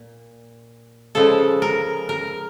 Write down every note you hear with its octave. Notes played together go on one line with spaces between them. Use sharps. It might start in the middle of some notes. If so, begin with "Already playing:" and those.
Already playing: A#2
C#3 F3 G#3 A4
A#4
A#4